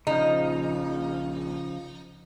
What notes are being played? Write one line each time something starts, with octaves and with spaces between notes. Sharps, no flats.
A#1 C#3 F3 D#4